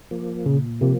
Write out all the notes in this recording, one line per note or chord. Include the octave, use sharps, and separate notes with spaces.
F3 A#3
A#2 C#3
C3 F3 A#3